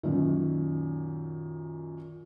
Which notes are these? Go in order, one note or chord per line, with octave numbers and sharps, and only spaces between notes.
F#2 A#2 D#3